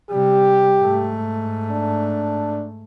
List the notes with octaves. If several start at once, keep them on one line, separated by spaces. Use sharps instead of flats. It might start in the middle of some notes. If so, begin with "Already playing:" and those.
C3 G3 G4
G#2 A3
D4